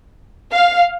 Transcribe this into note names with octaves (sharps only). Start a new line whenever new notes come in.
F5